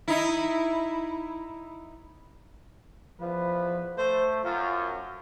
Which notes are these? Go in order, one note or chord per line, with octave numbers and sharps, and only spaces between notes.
D#4 E4
E2 F3 B4
A3 C5
F#2 F4